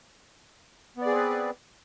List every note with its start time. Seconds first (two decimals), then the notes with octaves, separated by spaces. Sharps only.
0.97 B3
1.02 D5
1.06 G#4
1.11 C4
1.15 B4